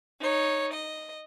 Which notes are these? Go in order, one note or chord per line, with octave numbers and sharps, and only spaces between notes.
D#4 C#5
D#5